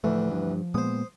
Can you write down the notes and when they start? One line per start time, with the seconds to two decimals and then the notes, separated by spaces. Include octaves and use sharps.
0.04 D2 A2 E3 F3 A3
0.31 G2
0.74 A#2 G#3 B3 C5 D#6